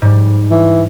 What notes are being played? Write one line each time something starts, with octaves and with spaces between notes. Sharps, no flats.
G#2 G3
E3